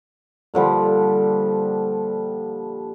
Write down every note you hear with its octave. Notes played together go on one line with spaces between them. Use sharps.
A#2 D3 F3 G3